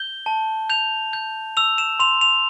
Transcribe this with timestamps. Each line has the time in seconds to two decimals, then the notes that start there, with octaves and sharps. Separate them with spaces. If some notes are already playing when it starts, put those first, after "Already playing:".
Already playing: G6 G7
0.26 A5
0.70 G6 F7
1.13 G6
1.57 E6 F7
1.78 E7
2.00 C6 F7
2.21 F7